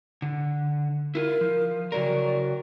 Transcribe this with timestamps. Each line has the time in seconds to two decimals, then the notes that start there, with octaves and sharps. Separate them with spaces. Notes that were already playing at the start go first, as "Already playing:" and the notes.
0.22 D3
1.15 E4 F4 A#4
1.41 F3
1.92 C#3 F#3 A#4 D5